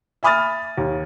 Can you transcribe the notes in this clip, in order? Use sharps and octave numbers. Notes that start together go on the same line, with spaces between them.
E5 G#5 B5 D#6 F6 A6
D#2